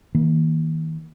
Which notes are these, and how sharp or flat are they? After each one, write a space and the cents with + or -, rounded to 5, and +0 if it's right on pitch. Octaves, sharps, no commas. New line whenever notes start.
D#3 +40 A#3 +0